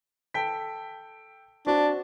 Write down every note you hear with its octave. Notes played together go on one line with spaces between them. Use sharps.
A4 G5 B6
C4 D4 F#4